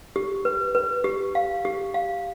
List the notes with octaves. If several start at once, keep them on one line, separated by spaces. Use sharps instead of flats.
G4
B4
B4
G4
F5
G4
F5